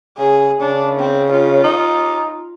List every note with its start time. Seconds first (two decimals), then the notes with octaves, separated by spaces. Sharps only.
0.18 C#3 G#4
0.60 C#3 D4
0.99 C4
1.31 F4
1.64 D#4